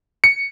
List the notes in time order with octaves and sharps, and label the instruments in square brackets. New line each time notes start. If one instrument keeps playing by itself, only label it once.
[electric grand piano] C#7